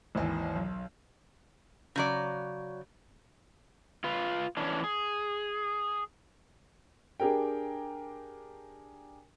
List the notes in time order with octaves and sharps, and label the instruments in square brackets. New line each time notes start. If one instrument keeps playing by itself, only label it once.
[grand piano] G#1 D#2 E3
B1
[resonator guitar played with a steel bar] C#3 F#3 D5
[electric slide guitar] F4 B4
E3 C#4 D4
G#4
[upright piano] D4 G4 G#4 A#4 G5